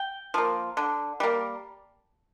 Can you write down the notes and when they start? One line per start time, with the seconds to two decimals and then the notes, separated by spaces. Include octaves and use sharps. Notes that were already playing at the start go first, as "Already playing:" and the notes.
Already playing: G5
0.34 F3 A#3
0.77 D3
1.20 G3 A#3